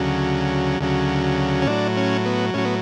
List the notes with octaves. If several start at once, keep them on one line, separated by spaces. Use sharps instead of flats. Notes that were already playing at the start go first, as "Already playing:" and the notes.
Already playing: D2 C#3 F#3
D2 C#3 F#3
C#4
A2 F#3 D4
C#4
B3
A2 F#3 C#4
B3